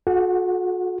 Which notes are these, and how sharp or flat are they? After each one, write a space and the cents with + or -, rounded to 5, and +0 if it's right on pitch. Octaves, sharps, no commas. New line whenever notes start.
F#4 -40 A4 -45 F#5 +0